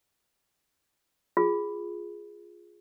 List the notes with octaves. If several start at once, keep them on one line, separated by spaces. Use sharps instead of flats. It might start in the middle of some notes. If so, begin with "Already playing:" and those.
F4 G#4